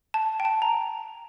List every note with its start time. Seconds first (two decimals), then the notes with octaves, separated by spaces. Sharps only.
0.14 A5
0.40 G5
0.45 A5
0.62 A#5